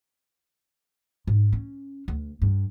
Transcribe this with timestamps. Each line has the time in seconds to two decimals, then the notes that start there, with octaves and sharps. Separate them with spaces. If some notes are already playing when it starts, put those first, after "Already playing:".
1.27 G#2
1.52 C#4
2.08 D2
2.42 G2